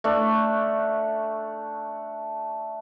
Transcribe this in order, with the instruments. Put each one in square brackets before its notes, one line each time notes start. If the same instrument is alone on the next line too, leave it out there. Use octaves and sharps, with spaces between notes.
[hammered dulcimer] A3 D4